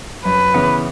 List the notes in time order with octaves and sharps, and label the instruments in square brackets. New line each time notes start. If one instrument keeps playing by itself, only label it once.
[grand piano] F#2 [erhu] B4
[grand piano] C#3 E3 B3